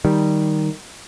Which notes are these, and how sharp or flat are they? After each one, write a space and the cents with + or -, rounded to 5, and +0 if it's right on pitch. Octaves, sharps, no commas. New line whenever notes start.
D#3 +0 G3 +0